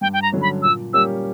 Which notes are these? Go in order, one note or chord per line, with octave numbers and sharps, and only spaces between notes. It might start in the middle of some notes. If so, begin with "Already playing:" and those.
G2 G5
G5
A#5
D3 F#3 C#4
B5
A#2 E6
G3 A#3 C#4 G4 E6